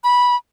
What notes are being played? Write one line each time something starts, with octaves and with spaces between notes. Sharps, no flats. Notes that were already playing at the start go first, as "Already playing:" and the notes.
B5